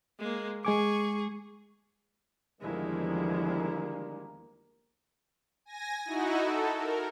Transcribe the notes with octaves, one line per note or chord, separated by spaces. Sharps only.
G#3 A#3
G#3 G#4 G#5 C#6 D6
E2 D3 D#3 F3 G3 G#3 A#3 E4
G#5 A#6
D#4 E4 F#4
A4
A#4